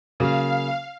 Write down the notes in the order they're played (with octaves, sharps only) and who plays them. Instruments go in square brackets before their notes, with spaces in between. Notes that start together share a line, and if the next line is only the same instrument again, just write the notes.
[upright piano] C#3 F#3 A#3 [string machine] F5